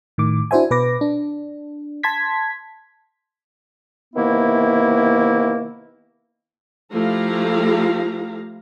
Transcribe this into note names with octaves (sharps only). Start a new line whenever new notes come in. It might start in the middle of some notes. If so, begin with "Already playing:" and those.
A2 D#3 D6
D4 E4 F#4 C5 E5 G#5
B2 B4 D6 A#6
D4
A5 C6 G#6 B6
C3 D#3 E3 A#3 B3 E4
F3 A3 E4 G4 F5 A#5